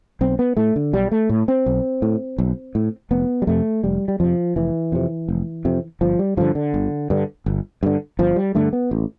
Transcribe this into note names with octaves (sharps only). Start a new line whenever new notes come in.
B1 C4
B3
A2 A3
D3
B1 G3
A3
A2
C4
B1
A2
B1
A2
F1 B3
G3
F2 C3 A3
F1 G3
G3
F2 C3 F3
F1 E3
F2 C3
F1
F2 C3
G1 F3
G3
G2 D3 F3
D3
G1
G2 D3
G1
G2 D3
G1 F3
G3
G2 D3 A3
B3
A1